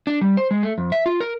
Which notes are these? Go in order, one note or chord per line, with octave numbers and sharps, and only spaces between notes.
D4
G3
C5
G#3
A3
F2
E5
F4
A#4